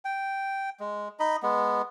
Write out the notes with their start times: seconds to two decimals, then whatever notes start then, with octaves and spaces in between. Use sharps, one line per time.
0.05 G5
0.80 G#3
1.20 D#4 D#5 B5
1.43 G#3 B3